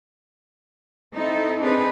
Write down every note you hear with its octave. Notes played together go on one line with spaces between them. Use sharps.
C4 D#4 E4 A4
C4 D4 D#4 G#4 B4